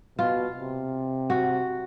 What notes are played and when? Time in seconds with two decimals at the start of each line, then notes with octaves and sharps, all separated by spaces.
0.19 B2 F4
0.56 C3
1.30 F#4